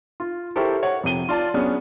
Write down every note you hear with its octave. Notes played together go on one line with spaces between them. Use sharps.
F4
E4 G4 A4 A#4 C5 C#6
C#5 F#5
F2 C3 D#7 G7
F4 D5 A5
F#3 B3 C#4 D4 G#4 F6